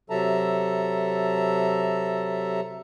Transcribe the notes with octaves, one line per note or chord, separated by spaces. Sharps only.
C3 F#3 A4 E5 A5 A#5